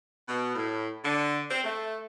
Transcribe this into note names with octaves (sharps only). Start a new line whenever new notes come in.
B2
A2
D3
C4
A3